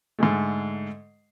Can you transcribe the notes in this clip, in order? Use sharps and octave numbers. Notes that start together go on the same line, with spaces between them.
G#2 D3 G#3 A3